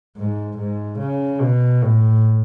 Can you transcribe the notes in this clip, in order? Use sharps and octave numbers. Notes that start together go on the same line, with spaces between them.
G#2
G#2
C#3
B2
A2